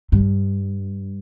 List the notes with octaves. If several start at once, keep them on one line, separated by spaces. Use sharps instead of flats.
G2